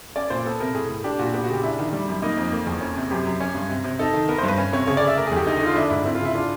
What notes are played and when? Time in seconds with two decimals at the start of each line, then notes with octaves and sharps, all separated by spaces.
0.16 C#4 D5
0.30 A#2 C5
0.45 B3 A4
0.60 C3 A#4
0.75 A2 G#4
0.89 A2
1.04 D4 G4
1.19 A#2 F#4
1.34 B3 G4
1.44 F#4
1.49 C#3 G4
1.63 D4 E4
1.78 D#3
1.93 G3
2.08 F#2
2.22 A#3 D#4
2.37 F2
2.52 A#3
2.67 E2
2.81 C#4
2.96 C3
3.10 F#2 G4
3.26 F#2
3.40 C#4
3.55 G2
3.70 C3
3.84 C3
3.99 D#4 A4
4.14 D#3
4.29 B3 A#4
4.38 C5
4.43 G2
4.48 B4
4.58 C#4
4.73 C3 C#5
4.87 C#3 C#5
4.97 D5
5.02 C#3
5.07 E5
5.17 A3 A#4
5.27 G#4
5.32 E2 G4
5.46 D3 D#4
5.56 D#4
5.62 D3 F4
5.76 D4 E4
5.90 G#2 E4
6.05 C4 E4
6.15 F4
6.20 C#3 E4
6.35 D4 F4